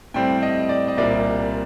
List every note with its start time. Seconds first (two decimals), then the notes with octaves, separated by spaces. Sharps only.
0.14 A2 G3 C4 G5
0.43 D#5
0.69 D5
0.88 D#5
0.97 C2 A#2 G3 C4 D5